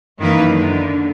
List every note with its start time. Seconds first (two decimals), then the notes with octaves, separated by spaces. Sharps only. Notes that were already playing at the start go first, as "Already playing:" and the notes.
0.18 F#2 D#3 E3 A#3 B4
0.53 D3